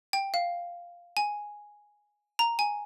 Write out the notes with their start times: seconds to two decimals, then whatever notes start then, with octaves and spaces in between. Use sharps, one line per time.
0.13 G5
0.34 F5
1.17 G#5
2.39 A#5
2.59 G#5